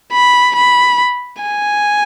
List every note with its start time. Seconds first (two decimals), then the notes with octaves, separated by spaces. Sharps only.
0.12 B5
0.56 B5
1.42 G#5